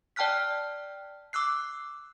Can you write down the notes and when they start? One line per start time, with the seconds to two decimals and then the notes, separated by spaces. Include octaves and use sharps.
0.16 D5 G5 A5 F6 F#6 B6
1.33 D6 E6 F#6 C7